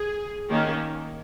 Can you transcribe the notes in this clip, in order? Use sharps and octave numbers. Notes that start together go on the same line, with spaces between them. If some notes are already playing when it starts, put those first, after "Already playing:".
Already playing: G#4
D#3 A#3 C#4